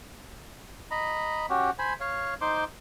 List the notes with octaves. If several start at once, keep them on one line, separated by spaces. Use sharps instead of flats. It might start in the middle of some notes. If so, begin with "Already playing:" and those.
D#5 A#5 B5
C#4 F#4 G4
C5 G#5 B5
C#5 F5
D#4 C5 C6 D6